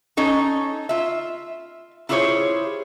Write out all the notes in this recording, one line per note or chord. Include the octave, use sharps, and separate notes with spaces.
C#4 D#4 A4
F4 E5
E4 F4 G4 G#4 C5 C#5